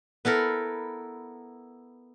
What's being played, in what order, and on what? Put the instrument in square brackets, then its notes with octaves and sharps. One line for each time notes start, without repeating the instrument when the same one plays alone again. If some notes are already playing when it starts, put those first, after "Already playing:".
[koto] B3 E4 A4 A#4